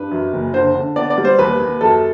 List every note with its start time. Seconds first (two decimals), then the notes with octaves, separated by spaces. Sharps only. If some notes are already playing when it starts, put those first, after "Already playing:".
Already playing: G2 B4
0.11 F#2
0.33 F#1
0.54 D3 C5
0.75 D3
0.96 B3 D5
1.10 D5
1.18 G3
1.25 C5
1.39 D#2 B4
1.60 D#2
1.81 F#2 A4